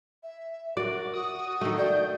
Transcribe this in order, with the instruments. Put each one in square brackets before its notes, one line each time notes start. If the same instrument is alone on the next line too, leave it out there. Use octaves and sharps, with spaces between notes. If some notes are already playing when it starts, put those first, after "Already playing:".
[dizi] E5
[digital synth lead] F#4 [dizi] A#4 [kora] D5
[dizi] F#4 [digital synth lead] D#6
[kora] D#3 A3
[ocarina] D5 [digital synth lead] G6